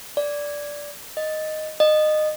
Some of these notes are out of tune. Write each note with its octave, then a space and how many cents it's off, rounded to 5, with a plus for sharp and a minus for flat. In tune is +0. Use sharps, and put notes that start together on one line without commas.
D5 -10
D#5 +0
D#5 -20